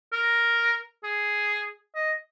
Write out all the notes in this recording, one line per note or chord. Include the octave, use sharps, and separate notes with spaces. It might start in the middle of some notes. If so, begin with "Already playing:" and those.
A#4
G#4
D#5